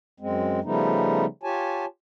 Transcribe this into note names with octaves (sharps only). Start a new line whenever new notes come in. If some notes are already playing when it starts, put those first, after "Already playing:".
F#2 G#3 C4
C#3 F3 G3 A3 B3 D#4
F4 G4 C#5 G#5 A5